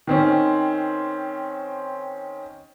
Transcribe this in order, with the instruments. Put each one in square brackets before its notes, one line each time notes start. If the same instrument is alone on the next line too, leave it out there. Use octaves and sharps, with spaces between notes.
[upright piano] D#3 C4 C#4